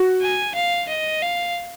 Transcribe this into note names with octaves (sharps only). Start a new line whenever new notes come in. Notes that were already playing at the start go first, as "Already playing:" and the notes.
Already playing: F#4
G#5
F5
D#5
F5